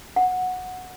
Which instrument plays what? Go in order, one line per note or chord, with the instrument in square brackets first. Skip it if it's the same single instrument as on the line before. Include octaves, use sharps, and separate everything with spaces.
[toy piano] F#5